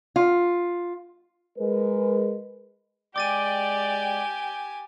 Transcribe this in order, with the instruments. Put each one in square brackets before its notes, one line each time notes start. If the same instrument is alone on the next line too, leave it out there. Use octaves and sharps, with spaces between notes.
[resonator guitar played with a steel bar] F4
[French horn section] G#3 A#4 B4
[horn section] G#3 D5 [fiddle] G4 G#5 [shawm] G5 [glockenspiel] D6 A6 D#7